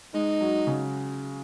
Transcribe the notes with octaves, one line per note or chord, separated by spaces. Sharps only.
G#3 D#4
F#3
C#3